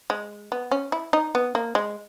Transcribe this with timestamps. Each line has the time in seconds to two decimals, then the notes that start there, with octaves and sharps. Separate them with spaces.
0.10 G#3
0.52 B3
0.71 C#4
0.92 E4
1.13 D#4
1.35 B3
1.55 A#3
1.75 G#3